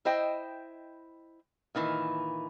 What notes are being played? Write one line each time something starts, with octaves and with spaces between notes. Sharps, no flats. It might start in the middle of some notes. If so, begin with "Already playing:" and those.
E4 C5 D#5 G5
A#2 D#3 E3